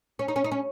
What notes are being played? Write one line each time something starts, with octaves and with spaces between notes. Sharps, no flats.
C#4
D#4
C#4
D#4
C#4